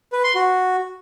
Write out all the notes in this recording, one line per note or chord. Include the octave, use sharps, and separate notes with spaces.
B4
C6
F#4